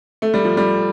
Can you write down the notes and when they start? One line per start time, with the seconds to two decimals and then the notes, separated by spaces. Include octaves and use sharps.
0.22 A3
0.34 G3
0.45 F3
0.57 G3